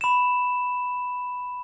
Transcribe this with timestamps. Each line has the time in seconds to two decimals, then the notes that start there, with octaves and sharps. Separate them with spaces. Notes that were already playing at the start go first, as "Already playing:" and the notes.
0.01 B5 E7